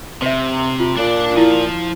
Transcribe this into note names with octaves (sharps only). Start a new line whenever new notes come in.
C3 C5 E5
F4
A#2 D4 D5
F3 E4